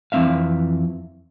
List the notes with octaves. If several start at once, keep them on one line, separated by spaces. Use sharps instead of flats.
F2 E3 A#3 C4 E5 F5